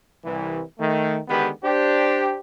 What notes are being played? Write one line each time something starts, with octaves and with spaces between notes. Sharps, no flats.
C2 E3
D#3 A3
D3 D#3 G#3 B3 G4 B4
D4 G4 C5